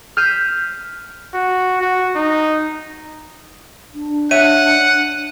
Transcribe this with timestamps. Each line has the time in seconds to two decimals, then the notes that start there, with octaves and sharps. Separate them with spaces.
0.17 F6 G6 B6 C7 D#7 E7
1.34 F#4
1.81 F#4
2.15 D#4
3.94 D4
4.31 C#5 E5 F#5 D#7